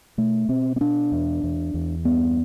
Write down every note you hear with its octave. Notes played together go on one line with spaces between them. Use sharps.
B2 A3
B2 C4
C4
B2 D4
E2
E2
E2
G2 B3